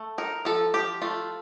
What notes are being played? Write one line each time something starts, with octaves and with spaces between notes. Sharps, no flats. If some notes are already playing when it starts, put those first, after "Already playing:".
Already playing: A3
D#4 A#4
F3 A4
F3 G4
A3 F4